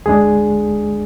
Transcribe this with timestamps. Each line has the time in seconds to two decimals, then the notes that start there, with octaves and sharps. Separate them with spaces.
0.06 D2 D3 G#3 D4 G#4